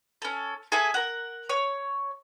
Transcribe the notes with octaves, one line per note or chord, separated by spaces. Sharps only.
C#4 A4
G#4 A4 E5 G#5
A#4 F#5
C#5